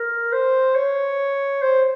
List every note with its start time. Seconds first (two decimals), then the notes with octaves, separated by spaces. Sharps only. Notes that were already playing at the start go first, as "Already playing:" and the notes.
Already playing: A#4
0.33 C5
0.75 C#5
1.62 C5